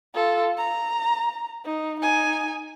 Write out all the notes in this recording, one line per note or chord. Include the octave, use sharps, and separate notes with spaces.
F4 A4
A#5
D#4
D#4 G#5